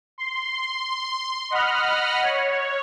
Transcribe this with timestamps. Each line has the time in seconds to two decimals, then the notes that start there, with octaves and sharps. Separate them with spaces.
0.18 C6
1.50 D#5 F#5 B5 F6
2.23 C#5